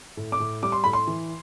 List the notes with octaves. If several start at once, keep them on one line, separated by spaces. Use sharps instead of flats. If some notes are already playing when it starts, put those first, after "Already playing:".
A2
D6
A2
G3 D6
C6
A2 B5
C6
E3